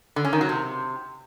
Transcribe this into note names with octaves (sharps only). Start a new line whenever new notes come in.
D3
C#4
D#3
F#3
C3